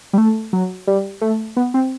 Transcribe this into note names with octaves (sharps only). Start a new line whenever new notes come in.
G3
A3
F#3
G3
A3
B3
C4